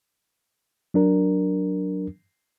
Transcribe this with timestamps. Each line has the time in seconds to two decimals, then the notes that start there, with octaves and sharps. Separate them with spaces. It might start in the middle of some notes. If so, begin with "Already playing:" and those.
0.94 F#3 D4 A#4